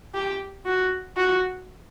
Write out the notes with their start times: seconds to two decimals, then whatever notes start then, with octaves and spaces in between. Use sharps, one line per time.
0.14 G4
0.66 F#4
1.17 F#4